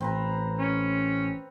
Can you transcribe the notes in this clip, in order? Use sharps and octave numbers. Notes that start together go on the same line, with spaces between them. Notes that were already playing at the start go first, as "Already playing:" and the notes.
A1 C4 B4 A#5
C#4